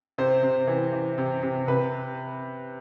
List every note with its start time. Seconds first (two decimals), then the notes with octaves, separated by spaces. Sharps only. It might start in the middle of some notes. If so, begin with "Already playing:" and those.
0.18 C3 C5
0.43 C3
0.67 E3
0.93 E3
1.18 C3
1.42 C3
1.67 C3 B4